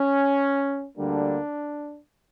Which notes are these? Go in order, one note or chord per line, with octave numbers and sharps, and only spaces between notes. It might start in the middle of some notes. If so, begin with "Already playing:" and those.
Already playing: C#4
D2 D3 G3 A#3 D4